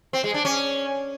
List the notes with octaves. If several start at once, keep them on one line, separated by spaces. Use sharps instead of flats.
C4
G#3
D4
C#4